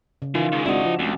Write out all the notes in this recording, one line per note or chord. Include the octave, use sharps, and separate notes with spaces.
C#3
D#3 E3 F4
C#3 G#3
G#1 D4 E4 F#4 D#5
F3
F1 C#2